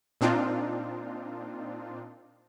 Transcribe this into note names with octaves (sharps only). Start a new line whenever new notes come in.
A#2 C4 D4 D#4 F4